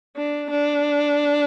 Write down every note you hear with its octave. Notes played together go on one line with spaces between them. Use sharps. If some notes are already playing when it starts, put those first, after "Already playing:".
D4
D4